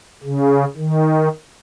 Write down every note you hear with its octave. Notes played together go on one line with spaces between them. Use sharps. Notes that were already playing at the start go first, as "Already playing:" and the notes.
C#3
D#3